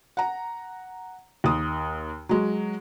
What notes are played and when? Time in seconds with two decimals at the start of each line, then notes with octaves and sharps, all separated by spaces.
0.17 F#5 A#5
1.44 D#2 D#6
2.29 F#3 G#3